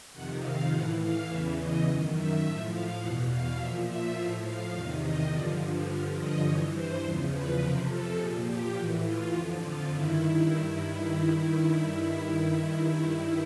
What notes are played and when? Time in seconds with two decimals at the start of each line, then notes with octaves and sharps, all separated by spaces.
0.13 F2 C3 D#3 F#5
0.41 F5
0.70 A2 E3 F#5
1.00 F5
1.28 E2 C#3 E3 E5
1.57 D#5
1.85 F#2 D#3
2.15 E5
2.43 A2 F3 E5
2.71 F5
3.00 E2 B2 F#5
3.29 F5
3.58 A#2 F3 E5
3.87 E5
4.15 A2 F3 F5
4.44 F5
4.73 E2 C3 D#3 F5
5.01 D#5
5.31 G2 D3 F3 D5
5.88 G2 D3 F3 F5
6.17 D#5
6.45 G2 E3 C#5
6.74 C5
7.03 E2 C#3 F3
7.31 B4
7.60 F2 C3 F3 A#4
7.89 A4
8.18 A#2 F3 G#4
8.46 G4
8.75 A2 E3 F#4
9.04 F4
9.32 F2 D3 F3 F4
9.61 F4
9.90 G2 D#3 E4